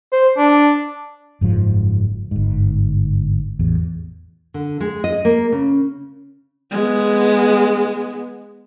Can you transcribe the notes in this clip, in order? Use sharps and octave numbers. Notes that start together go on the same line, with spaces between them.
C5
D4
F#1 G#2 F3
G1 G#2
A1 E2
D3
G#3
D#5
A#3
C#3
G#3 B3